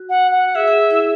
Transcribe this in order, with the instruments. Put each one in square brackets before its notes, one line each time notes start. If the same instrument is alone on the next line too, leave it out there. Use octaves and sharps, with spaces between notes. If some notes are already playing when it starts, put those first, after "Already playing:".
Already playing: [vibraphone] F#4
[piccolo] F#5
F#5
[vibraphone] G#4 [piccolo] E5
[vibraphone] G#4
G#4
E4